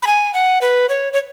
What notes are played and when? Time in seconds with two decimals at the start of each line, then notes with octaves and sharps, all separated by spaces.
0.02 B5
0.07 G#5
0.34 F#5
0.61 B4
0.89 C#5
1.13 C#5